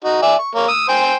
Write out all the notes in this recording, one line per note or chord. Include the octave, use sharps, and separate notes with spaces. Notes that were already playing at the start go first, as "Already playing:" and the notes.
D#4 F#4
D5 E5 G#5
C#6
A#3 C#5
D#6 E6
C5 G5 G#5